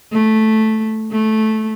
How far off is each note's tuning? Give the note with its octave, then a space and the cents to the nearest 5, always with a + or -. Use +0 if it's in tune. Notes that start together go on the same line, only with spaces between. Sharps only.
A3 -5
A3 -10